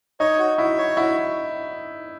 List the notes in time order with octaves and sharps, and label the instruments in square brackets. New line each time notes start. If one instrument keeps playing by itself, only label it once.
[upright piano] D#4 [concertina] C#5
[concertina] F#4
[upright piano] E4 [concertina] F#4
[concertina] C#5
[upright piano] E4 [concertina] F#4